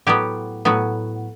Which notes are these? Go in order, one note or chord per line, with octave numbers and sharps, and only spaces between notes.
A2 F#3 B3 G4
A2 F#3 B3